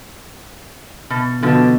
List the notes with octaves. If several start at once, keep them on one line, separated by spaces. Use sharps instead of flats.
B2
B2 D3 F3